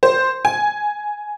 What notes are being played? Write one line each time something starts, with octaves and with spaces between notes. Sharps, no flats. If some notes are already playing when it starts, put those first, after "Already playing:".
C5
G#5